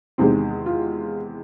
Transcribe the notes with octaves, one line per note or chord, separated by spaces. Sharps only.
E2 C3 D#3 G#3 C4
F4